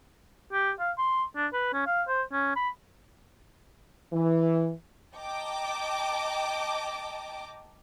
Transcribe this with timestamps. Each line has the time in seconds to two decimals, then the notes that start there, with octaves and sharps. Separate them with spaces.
0.52 G4
0.80 F5
0.98 C6
1.36 D4
1.53 B4
1.73 C#4
1.86 F5
2.08 C5
2.32 C#4
2.56 B5
4.13 E3
5.17 D#5 G5 A5 A#5 D6